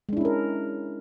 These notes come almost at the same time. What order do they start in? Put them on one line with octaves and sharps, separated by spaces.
G#3 D4 E4 C#4 A#4